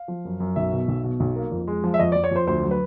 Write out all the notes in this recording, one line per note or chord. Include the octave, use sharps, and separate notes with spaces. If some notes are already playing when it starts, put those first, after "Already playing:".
Already playing: F5
F3
F#2
F#2
B1 E5
B2
B1
B2
B1
A#3
F2
G#3
F3
E5
F2 D#5
F2 D5
C#5
F2 C5
D2 C5
F#3
B4